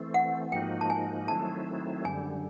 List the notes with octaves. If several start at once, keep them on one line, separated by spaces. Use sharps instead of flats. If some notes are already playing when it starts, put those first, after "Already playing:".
Already playing: E3 A3 C4
F#5
G#2 F3 A#3 D#4 F#4 G5
A5
G#5
D#3 F#3 A3 C4 E4 A5
F#2 D3 G3 G#5